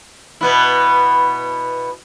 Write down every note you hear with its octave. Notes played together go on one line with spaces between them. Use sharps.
B2 B3 E4